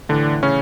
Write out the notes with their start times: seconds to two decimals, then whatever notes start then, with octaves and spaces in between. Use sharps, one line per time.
0.09 A2 D3 E3 D4
0.43 C#3 C#4